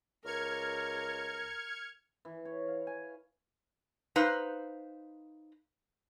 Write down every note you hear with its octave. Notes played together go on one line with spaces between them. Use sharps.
C#2 A#4 F6 G#6 C#7
E3
C#5
F5
G#5
D#4 B4 C5 F5